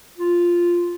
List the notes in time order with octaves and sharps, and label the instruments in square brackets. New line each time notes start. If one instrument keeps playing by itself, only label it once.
[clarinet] F4